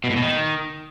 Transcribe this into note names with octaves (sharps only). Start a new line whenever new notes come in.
B2
A2
B2
D#3